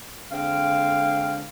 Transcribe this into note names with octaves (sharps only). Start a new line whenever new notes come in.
D3 G#3 C4 F5